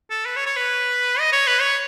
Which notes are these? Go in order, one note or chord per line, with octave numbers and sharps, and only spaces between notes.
A4
B4
C#5
C#5
B4
D#5
C#5
B4
C#5